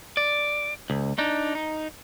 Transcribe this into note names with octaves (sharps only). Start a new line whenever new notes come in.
D5
C#2
D4 D#4
D#4